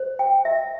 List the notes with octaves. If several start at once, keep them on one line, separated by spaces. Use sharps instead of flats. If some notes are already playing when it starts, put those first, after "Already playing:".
Already playing: C5
G5
E5